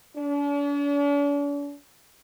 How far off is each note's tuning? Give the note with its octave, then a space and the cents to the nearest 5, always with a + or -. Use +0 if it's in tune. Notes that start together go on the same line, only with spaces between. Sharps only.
D4 -45